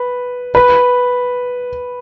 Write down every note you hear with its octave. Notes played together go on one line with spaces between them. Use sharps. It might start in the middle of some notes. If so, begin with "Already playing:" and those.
Already playing: B4
B4